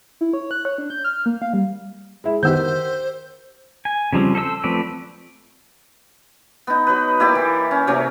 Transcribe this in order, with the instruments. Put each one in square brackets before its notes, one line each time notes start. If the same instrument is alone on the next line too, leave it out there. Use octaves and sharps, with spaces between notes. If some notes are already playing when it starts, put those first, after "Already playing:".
[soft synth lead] E4
C#5
F#6
C#5
D4
G6
F6
A#3
F5
G3
[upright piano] G#3 E4
[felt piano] D#3 B3 F#5 [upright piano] G4 E6 G6 [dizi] C5
[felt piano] A#4
[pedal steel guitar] G#5
C#3 F3 G3 C4
A4 C5 D#5 E6
F3 A3 C4 B4 D5
[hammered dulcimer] B3 D#4
F#3 B4
A#3 E4 G4 D5
E3
C#4
C3 F#3 A#3 C#4